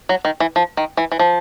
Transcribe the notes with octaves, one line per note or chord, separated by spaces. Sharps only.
F#3
D#3
E3
F3
D#3
E3
E3
F3